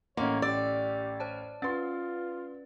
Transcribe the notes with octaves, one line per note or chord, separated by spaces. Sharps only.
A1 A#3 C#4 C#5 D#5 F#5 C6
G4 D5 E6
C5 C#5 A5
C#4 F4 B4 C6 A6